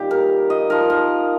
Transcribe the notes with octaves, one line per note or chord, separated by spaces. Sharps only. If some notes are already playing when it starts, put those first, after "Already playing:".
Already playing: A#2 G3 D#4 G4
A#4
D#5
F3 D#4 A#4
A#4